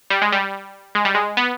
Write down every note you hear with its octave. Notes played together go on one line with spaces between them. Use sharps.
G3
G#3
G3
G#3
G3
G#3
B3